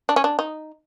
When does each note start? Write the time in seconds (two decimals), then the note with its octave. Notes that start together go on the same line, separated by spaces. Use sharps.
0.09 D4
0.16 C#4
0.24 D4
0.39 D#4